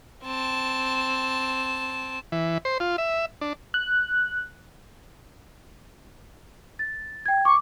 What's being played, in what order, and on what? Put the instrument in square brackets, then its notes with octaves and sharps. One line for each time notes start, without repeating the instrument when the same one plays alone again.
[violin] C4 A5
[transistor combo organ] E3
C5
F4
E5
D4
[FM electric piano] F#6
[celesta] A6
G5 G#6
[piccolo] C#6 [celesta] D6